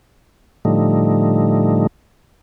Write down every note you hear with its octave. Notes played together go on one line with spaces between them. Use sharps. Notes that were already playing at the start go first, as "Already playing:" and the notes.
A2 D3 F3 G3 A3 D#4